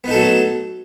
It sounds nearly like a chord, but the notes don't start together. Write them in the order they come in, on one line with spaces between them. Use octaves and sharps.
B3 D#4 A4 F#3 A3